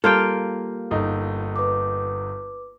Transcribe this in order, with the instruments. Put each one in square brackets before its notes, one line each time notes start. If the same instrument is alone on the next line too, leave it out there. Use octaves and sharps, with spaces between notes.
[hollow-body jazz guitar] G3 A4 [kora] A#3 F4 G5
[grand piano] G1 D#4
[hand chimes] B4 D6